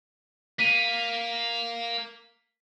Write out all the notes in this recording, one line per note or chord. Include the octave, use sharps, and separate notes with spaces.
A#3 B6 D#7